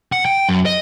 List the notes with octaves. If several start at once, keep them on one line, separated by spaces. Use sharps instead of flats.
F#5
G5
F#2
D#5